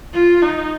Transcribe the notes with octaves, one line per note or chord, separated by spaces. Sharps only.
F4
D#4